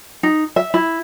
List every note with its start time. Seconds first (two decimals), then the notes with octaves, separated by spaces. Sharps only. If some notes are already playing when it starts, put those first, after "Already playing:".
0.23 D#4
0.56 E5
0.74 E4